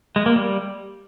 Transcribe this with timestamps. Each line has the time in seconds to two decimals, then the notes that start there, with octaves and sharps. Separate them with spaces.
0.16 G#3
0.26 A#3
0.36 G3